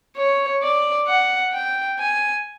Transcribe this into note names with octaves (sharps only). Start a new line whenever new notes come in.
C#5
D5
F#5
G5
G#5